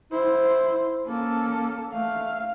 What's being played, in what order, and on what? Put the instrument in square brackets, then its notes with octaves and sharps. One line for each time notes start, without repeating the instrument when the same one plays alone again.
[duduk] E4 [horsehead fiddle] C5
[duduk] A#3 [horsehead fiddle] C#4 A4
[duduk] A3 [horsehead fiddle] F5